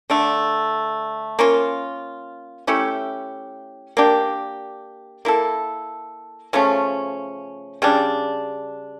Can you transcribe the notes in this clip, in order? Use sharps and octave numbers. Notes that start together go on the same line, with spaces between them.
D3 A3 D4
A#3 C#4 F4
A3 C#4 E4 G4
A#3 D4 G4
A#3 E4 A4
C#3 F3 A3 C#4
C#3 G3 D4